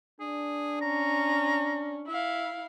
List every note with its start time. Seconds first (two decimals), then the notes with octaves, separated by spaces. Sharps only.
0.20 D4 G#4
0.82 C#4 A#5
2.08 E4 E5 F5